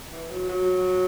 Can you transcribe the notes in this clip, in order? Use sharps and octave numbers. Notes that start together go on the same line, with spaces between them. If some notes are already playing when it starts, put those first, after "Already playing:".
E3
F#3
F#3